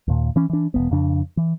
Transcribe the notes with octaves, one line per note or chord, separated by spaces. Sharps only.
D#2 A#2
E3 C#4
E3 D4
E1 D#2 B3
F2 C#3 D4
E3